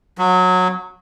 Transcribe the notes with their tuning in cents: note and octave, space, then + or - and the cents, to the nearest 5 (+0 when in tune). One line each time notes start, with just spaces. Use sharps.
F#3 -20